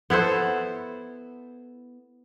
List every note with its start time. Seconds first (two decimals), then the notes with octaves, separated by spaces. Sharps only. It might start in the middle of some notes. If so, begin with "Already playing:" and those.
0.10 B3 E4 A4 C5